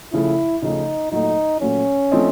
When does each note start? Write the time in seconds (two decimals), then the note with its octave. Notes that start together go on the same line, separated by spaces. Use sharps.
0.13 C#3 F3 A3 E4
0.62 C#3 F3 A3 D#4
1.12 A#2 F#3 A3 D#4
1.61 A#2 F#3 A3 C#4
2.11 F3 A3 C4 D#4